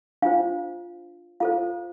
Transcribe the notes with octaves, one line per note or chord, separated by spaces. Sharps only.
D4 F4 C5 F5
F4 A4 C5 F5